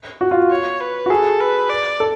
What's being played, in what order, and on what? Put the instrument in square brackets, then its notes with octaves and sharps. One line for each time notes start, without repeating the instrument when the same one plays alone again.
[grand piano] F#4
F4
[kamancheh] C#5
B4
[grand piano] F#4
[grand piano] G#4 [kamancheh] A4
[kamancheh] B4
D5
[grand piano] A4